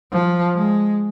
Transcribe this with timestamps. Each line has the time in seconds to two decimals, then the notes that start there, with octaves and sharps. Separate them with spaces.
0.12 F3
0.56 G#3